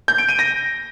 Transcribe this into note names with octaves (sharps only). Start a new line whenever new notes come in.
G6
D7
D#7
A#6